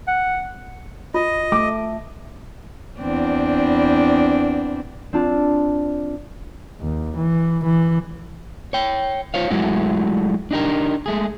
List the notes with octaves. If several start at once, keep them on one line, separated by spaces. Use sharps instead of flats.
F#5
F4 D#5
A3 D6
E2 C4 D4
C4 D4 F4
D#2
E3
E3
C#5 G5
F4 C5 C#5 F5
F#3 G#3 A3 E4 F#4
D4 D#4 G4 A#4
G#3 A3 G#4